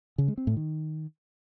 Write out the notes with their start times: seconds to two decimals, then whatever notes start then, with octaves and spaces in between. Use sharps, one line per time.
0.18 C#3
0.28 G#3
0.38 C4
0.47 A2
0.57 D#3